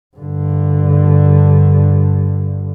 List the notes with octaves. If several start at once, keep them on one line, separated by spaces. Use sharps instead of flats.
G2 D3